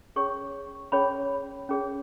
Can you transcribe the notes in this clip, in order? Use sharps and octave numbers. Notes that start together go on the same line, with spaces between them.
C#4 G#4 C#5 C#6
C#4 G#4 C#5 B5
C#4 G#4 C#5